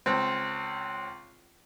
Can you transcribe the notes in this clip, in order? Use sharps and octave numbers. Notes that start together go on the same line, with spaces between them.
C#2 C4